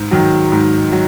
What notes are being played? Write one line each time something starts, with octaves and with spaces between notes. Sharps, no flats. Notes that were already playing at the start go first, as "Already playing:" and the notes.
Already playing: G#2
D#3 F#3
G#2
F#3